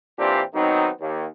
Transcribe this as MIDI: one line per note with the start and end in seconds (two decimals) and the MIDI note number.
0.18 0.41 46
0.18 0.41 52
0.18 0.41 60
0.18 0.41 62
0.18 0.41 65
0.18 0.41 67
0.53 0.89 51
0.53 0.89 54
0.53 0.89 59
0.53 0.89 60
0.53 0.89 63
1.00 1.25 39